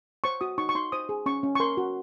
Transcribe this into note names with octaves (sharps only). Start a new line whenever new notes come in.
C5 C#6
F#4 D#6
D#4 C#6
C#6
D#4 C6
C5 D#6
G#4
C#4 C#6
C#4
C#6
A#4 C6
F#4